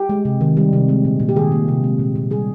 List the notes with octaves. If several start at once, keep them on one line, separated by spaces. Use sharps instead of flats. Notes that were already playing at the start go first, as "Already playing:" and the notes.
Already playing: G4
G#3
C3
D#3
G3
C3
G#3
A#2
A#2
G4
D#3 G#4
A#3
C3
G#3
A#2
A#2
G3 G#4